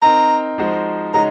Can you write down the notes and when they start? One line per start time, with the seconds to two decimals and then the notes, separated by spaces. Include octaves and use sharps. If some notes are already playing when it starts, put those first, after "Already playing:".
0.02 C4 D#4 A#4 A#5
0.58 F3 G#3 D#4 F#4 C5
1.14 C#3 G#3 D#4 F#4 A#5